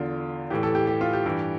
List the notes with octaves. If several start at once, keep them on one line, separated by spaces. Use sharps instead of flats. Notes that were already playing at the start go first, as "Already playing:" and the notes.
Already playing: E2 D3 F4
A2 E3 G4
A4
G4
G4
F4
G4
G2 E3